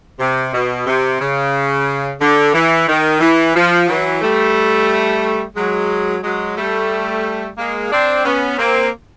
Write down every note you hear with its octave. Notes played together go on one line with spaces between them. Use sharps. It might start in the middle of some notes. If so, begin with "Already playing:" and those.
C3
B2
C3
C#3
D3
E3
D#3
E3
F3
E3 F#3
G3 A3
F#3 G#3
F#3 G#3
G3 A3
G#3 A#3
C4 D4
B3 C#4
A#3 C4